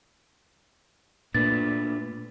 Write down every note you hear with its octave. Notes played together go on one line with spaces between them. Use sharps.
A#2 A3 D4 B4 A6